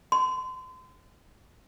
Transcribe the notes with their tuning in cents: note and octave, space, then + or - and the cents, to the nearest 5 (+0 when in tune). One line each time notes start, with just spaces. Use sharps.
C6 -35